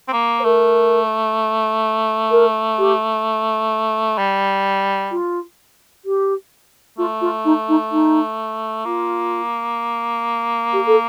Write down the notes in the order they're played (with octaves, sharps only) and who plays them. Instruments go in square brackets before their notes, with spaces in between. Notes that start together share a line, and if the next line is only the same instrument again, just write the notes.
[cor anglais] C4
A#3
[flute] C5
[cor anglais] A3 [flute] A#4
[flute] A#4
G4
[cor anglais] G3
[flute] F4
G4
[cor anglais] A3 [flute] F4
[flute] F4
D#4
D#4
D#4
[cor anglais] A#3 [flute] F4
[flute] G4
A4